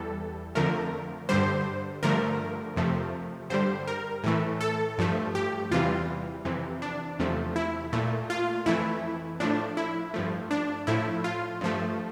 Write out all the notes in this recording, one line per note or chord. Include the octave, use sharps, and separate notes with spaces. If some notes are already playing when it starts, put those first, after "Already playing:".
Already playing: E2 E3 G3 A4
F2 D3 F3 A3 A#4
G2 D3 G3 C5
G2 D3 F3 A3 A#4
F2 C3 F3 A3
G2 D3 G3 C5
A#4
A2 E3 A3
A4
G2 F3 A3
G4
E2 C3 E3 G3 F4
F2 C3 E3
D4
E2 C3 F3 A3
E4
A#2 A3
F4
F2 E3 A3 E4
A2 F3 A3 D4
E4
G2 F3 A3
D4
A2 F3 A3 E4
F4
G2 F3 A3